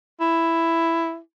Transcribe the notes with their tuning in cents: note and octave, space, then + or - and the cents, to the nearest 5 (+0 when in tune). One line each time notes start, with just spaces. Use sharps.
E4 +5